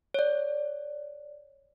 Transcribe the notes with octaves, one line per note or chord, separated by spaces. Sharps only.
C#5 D5